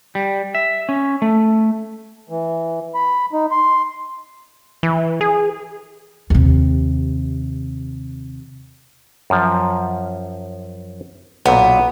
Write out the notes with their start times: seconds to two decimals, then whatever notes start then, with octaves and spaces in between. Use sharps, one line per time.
0.15 G3
0.55 E5
0.89 C#4
1.22 A3
2.30 E3
2.95 B5
3.33 D#4
3.51 C6
4.83 E3
5.21 G#4
6.30 D#2 C3
9.30 F#2 F3
11.46 B1 A#2 B3